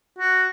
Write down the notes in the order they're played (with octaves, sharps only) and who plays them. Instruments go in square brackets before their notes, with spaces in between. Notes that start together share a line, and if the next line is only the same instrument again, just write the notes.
[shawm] F#4